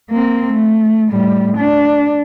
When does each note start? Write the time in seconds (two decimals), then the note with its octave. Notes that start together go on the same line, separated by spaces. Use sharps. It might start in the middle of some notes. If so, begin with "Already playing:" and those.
0.11 A#3 C4
0.53 A3
1.09 A2 G3
1.57 D4